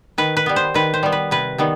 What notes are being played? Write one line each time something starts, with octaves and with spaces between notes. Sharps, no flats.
D#3 B4
B4
G3 B3
C5
D#3 B4
C5
G3 B3
B4
C3 B4
D#3 G3 B3